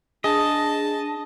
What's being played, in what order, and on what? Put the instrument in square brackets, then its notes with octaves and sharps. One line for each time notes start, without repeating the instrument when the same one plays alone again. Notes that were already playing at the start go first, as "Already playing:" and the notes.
[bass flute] D4 [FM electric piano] G#4 [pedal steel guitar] D#5 [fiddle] A5